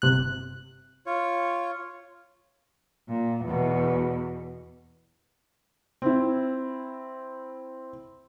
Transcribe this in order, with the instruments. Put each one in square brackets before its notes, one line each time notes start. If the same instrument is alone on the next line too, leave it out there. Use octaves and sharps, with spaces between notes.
[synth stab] G1 C3 F#6
[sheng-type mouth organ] F4 C#5
[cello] A#2
E2 B2
[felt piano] C4 E4